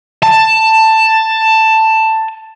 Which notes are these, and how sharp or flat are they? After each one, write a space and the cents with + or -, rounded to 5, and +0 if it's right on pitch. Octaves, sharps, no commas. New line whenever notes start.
A5 +10